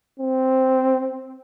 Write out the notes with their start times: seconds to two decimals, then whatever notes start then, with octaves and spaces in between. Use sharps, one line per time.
0.20 C4